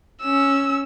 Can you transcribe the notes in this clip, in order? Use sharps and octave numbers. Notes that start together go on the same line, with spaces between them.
C#4 E6